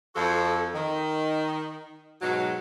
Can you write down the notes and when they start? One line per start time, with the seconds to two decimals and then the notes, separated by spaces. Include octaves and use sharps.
0.15 F2 F3 F#4 A4
0.74 D#3
2.21 G#2 B2 F#3